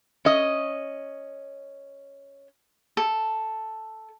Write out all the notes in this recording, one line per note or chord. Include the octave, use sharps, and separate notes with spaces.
C#4 D#5
A4